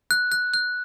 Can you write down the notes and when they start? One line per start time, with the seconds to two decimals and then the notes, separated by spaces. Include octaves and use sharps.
0.11 F#6
0.32 F#6
0.54 F#6